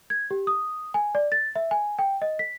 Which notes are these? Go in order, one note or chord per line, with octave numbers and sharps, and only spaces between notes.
G#6
G4
D#6
G#5
D5
A6
E5
G#5
G5
D#5
B6